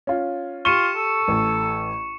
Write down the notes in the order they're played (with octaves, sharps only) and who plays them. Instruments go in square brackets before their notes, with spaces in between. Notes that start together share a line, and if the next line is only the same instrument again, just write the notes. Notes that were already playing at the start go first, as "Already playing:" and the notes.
[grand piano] C#4 F4
[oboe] F4 [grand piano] G4 D#7 G7 [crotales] C#6 C#7 E7
[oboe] A4
[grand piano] A1